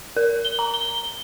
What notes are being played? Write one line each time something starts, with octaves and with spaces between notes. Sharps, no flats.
A#4
G7
A#5
G7